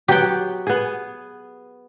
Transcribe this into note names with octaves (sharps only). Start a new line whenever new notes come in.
F#3 B3 G4 F#5 G5
B3 G#4